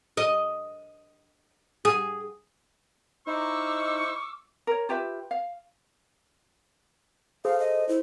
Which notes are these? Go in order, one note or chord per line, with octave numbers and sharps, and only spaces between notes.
D#5
G#4
D#4 E4 C5 C#6 D6 E6 F6
A#4 C#5
F4 G4 B4 E5
F5
G#4 A4 C5 F5
D#5
E4 C5